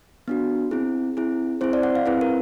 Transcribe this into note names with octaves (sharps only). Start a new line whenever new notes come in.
B3 D4 F#4
C4 E4 G#4
C4 E4 G#4
C4 E4 G#4 C5
D5
F#5
F5
C4 E4 G#4 B4
A#4